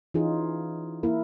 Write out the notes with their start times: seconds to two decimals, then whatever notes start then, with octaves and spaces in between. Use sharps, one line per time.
0.14 E3 C#4 D#4 F4 G#4
1.03 A#3 E4 A#4